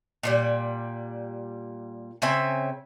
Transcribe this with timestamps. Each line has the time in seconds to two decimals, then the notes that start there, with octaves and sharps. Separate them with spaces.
0.23 A#2 D#3 G3
2.22 C#3 C4 E5 G#5